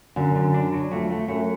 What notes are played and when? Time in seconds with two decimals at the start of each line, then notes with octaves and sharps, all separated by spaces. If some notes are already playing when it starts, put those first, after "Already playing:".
0.16 F#2 D3
0.35 D3
0.54 D4
0.72 F#3
0.92 F2 A3
1.10 A3
1.28 F#2 A3